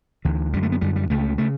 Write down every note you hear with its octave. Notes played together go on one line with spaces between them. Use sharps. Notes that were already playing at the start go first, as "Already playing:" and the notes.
D2 D3 E3
F#2 D3 G3
A3
B3
F#2 D3 G3
G3
C#2 C#3 A3
C#3 A3